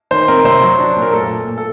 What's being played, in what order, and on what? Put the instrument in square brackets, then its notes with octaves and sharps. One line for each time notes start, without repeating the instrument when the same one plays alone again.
[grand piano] D#3 C5
C4 A#4
C3 C5
F#3
D4
A#2
A#4
A3 A4
A#2
A#2
A4